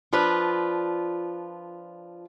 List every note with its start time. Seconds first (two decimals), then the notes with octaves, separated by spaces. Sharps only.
0.13 F3 D4 F4 B4